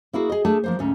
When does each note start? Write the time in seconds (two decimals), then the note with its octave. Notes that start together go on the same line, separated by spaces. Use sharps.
0.13 A#3 E4 F#4 G#4
0.30 G#4 D#5
0.45 A3 D4 G#4 A5
0.64 F3 A#3 C5
0.79 D2 G#2 C#4